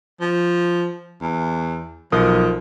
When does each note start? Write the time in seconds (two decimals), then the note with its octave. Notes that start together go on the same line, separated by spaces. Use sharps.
0.21 F3
1.22 E2
2.12 B1 F3 A#4 D#6